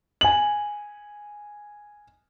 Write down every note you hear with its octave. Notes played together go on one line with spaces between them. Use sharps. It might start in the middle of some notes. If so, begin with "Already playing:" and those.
G#5 F#7